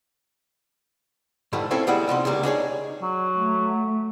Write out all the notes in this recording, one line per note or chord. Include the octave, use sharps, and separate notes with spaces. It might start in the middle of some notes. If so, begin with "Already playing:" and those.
G#2 D3 E3 F3 G3 A3
F3 C4 C#4 E4 F4 A4
D2 G3 G#3 E4 F#5
C3 F3 D#4 C6
C#2 D#3 G3 A#3
D4 D#4 G#4 C#5
F#3
A3